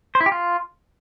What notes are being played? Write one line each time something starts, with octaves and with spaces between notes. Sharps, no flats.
C5
E4
G4
F4